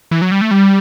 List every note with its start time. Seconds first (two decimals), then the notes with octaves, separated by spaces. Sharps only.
0.11 E3
0.22 F#3
0.31 G3
0.41 A3
0.51 G3